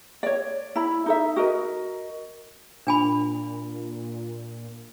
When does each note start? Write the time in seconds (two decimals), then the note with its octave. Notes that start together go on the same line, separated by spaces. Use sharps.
0.23 C#5 D5
0.76 E4 B5
1.06 D#4 A4 E5
1.36 F#4 A#4 D#5
2.87 A#2 D4 G#5 B5